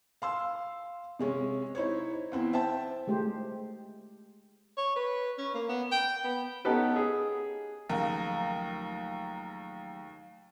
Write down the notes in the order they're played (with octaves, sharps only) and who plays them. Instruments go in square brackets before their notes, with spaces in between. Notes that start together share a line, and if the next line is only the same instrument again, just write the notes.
[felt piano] F5 C6 E6
C3 G#3 C#4
D#4 E4 C5 C#5
E2 C4 E4
C5 E5 G5 A5
[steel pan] G#3 A3 G4 C5
[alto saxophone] C#5
B4
C#4
A#3
B3
G5
B3
[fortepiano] B3 C#4 D#4 G4 A4 B4
G#4
[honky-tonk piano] D#2 C#3 A#4 [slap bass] F3 F#3 A3